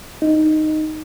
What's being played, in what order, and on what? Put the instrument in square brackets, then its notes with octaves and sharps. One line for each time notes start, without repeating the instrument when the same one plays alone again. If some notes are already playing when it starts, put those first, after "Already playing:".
[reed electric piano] D#4